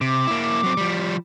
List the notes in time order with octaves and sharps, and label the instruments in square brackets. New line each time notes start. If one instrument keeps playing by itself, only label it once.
[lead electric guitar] C3 [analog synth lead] D6
[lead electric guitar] A#3 E4
F#3 C4
F3 G3